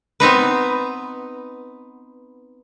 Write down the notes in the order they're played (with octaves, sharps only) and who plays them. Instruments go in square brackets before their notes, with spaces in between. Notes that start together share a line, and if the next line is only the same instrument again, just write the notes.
[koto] B3 C4 D#4 B4